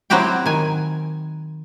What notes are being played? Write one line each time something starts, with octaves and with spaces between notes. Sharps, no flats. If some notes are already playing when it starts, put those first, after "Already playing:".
F#3 C4 E4 F#4 G4 G5
D#3 G#5